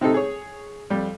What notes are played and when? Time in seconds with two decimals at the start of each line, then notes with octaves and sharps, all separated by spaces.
0.01 C3 C4 D#4 A4
0.14 G#4 C#5
0.90 F2 G3